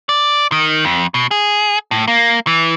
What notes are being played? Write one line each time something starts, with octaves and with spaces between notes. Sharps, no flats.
D5
D#3
F2
B2
G#4
A2
A#3
E3